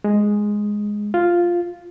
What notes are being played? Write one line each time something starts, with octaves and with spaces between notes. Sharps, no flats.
G#3
F4